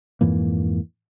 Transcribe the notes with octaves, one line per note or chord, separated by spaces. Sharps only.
F2 G#2 E3 A#3